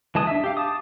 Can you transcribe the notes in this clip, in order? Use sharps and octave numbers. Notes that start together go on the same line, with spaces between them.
E3 G#3 A5 D#6
D4 E5
G4 F5
A5 D6 D#6